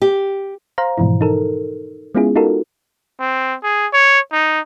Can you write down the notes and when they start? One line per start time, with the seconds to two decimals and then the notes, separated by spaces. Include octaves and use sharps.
0.02 G4
0.78 C5 F5 A#5
0.98 G#2 B2 E3 F3 E4
1.21 D#4 A4 A#4
2.15 G#3 B3 C#4 E4 F4 G#4
2.36 D#4 F4 F#4 A4 A#4
3.20 C4
3.63 G#4
3.93 C#5
4.32 D#4